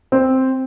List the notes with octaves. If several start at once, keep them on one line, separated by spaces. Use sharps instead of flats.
C4